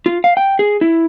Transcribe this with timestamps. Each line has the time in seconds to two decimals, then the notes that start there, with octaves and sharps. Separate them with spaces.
0.06 F4
0.24 F5
0.37 G5
0.59 G#4
0.81 E4